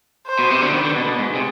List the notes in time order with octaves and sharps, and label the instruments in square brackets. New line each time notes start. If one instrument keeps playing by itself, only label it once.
[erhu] C5
[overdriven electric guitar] B2
C3
D3
[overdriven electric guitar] D#3 [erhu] B4
[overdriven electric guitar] D3
B2
B2
[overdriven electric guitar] G#2 [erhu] G#4
[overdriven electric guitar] C3